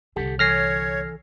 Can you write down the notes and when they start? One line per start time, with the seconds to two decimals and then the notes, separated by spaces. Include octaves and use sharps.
0.16 C2 D3 G4 A4 F#5
0.39 E3 A4 C#5 G#5 F6 A#6 C7